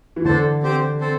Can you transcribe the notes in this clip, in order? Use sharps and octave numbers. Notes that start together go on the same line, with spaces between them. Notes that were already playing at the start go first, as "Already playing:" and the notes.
E3
D3 D4 A4 C5 A5
C4 G4 C5 G5
C4 A4 C5